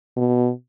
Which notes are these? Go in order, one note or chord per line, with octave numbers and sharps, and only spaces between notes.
B2